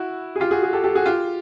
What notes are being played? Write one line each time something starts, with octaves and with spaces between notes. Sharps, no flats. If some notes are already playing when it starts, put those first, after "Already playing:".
Already playing: E4 F#4
G#4
F4 G4
F#4 G#4
F#4 G#4
G4 A4
G4 A4
F#4 G#4
F4 G4